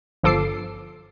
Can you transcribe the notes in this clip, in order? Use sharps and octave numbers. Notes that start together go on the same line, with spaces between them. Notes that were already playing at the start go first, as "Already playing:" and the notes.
G1 F3 A4 D6 C7